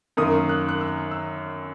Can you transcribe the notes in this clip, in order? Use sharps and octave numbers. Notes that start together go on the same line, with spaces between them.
F#2 D#3 A#3 D#6
F#6
F#6
E6
E6